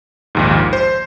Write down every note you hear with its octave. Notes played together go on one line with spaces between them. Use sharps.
A#1 D#2 G#2
C5